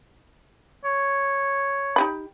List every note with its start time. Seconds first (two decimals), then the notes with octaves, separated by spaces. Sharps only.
0.85 C#5
1.96 D#4 G4 B5